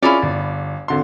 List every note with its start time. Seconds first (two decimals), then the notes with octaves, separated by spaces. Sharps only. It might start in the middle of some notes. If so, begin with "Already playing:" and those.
0.02 C#4 E4 F4 G#4 A#4 D5
0.22 G1
0.88 G#1 D3 C6